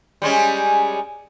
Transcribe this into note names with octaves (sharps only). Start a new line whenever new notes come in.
G3 G#3 C#4